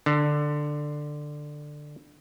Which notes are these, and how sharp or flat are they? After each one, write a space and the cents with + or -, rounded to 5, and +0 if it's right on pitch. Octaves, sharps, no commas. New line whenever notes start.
D3 +10